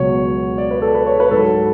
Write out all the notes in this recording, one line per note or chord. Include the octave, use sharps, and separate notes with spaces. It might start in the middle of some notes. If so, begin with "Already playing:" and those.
Already playing: C#2 B2 F#3 C#5
D5
B4
A4
B4
C#5
B4
G#2 F#3 A4